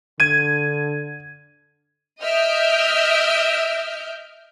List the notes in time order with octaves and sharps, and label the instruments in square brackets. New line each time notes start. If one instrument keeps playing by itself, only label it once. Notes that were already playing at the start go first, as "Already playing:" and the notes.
[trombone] D3 [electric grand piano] G#6 D#7
[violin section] D#5 E5 F6 G6 D7